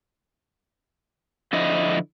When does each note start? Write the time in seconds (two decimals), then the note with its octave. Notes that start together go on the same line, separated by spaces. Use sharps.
1.53 D3 F3 E4 D#5